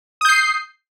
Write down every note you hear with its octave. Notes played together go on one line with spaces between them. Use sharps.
D#6 G6 C7